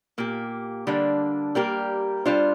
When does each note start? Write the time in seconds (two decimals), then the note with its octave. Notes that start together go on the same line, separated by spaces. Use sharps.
0.18 A#2 A#3 G4
0.87 D3 G3 A#3 D4
1.55 G3 A#3 G4 A#4
2.25 G3 D4 F4 C5